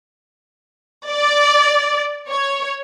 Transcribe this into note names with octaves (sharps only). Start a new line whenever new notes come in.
D5
C#5